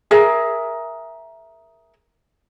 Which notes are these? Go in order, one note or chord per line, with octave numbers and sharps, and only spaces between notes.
G#4 A#4 E5